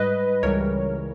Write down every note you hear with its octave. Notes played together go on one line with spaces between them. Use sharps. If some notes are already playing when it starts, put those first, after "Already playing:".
Already playing: G#2 G3 B4 D#5
C#2 C#3 E3 G3 A#4 C#5